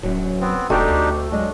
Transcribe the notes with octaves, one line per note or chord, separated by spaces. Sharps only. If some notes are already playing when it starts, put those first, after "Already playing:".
D1 F#2 F#3
B3 C4
E1 A3 C4 D4 D#4 F#4 G4 G5
D2
F#3 G#3 D4 D#5